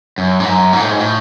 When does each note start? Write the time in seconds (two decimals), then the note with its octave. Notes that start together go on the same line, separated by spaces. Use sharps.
0.18 F#2
0.40 G#2
0.45 F#2
0.73 G#2
0.81 A2
0.91 G#2
1.00 A2